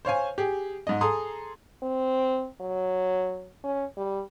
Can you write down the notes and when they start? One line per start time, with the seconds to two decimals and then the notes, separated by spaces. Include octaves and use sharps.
0.05 C5 C#5 F5 G#5
0.38 G4 G#4
0.87 G#2 D#5
1.01 G#4 A4 A#5 C6 D#6
1.83 C4
2.61 F#3
3.64 C#4
3.97 G3